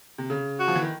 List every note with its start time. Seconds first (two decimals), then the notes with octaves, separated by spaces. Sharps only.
0.18 C3
0.30 C#3
0.59 F#4
0.68 F3
0.75 E3
0.82 D#3